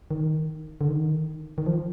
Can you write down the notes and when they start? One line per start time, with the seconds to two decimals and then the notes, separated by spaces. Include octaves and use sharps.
0.11 D#3
0.81 D3
0.89 D#3
1.58 D#3
1.66 F3